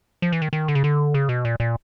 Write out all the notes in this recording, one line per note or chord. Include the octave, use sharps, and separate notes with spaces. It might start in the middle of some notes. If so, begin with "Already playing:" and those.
F3
E3
D#3
D#3
D3
C#3
D3
C#3
B2
A#2
A#2